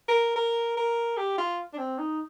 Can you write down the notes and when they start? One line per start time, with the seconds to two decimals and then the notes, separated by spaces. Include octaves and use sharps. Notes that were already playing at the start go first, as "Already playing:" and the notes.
0.08 A#4
0.36 A#4
0.77 A#4
1.17 G4
1.38 F4
1.73 D4
1.78 C4
1.99 D#4